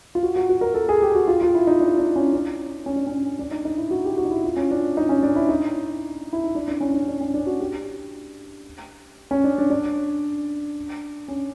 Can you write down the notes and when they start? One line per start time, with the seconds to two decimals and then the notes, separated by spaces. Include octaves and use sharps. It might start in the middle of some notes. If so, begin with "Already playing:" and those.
0.15 F4
0.23 F#4
0.36 F#4
0.49 F#4
0.61 A#4
0.74 A4
0.89 G#4
1.02 G4
1.15 F#4
1.28 F4
1.41 F4
1.55 E4
1.67 D#4
1.80 D4
1.98 D4
2.16 C#4
2.33 D4
2.86 C#4
2.96 D4
3.07 C#4
3.39 D4
3.51 D#4
3.65 D#4
3.78 E4
3.91 F#4
4.05 G4
4.17 F#4
4.25 D#4
4.31 E4
4.44 F4
4.56 C#4
4.71 D4
4.97 D#4
5.09 C#4
5.23 D4
5.36 E4
5.49 D#4
6.33 E4
6.44 D#4
6.55 D4
6.68 D4
6.81 C#4
6.94 D4
7.08 D4
7.21 C#4
7.34 D4
7.46 F#4
7.60 G4
9.31 C#4
9.44 D4
9.58 D4
9.70 D4
11.28 C#4